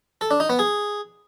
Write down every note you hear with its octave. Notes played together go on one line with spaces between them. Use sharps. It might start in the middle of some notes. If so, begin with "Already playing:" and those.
A4
D4
D#4
B3
G#4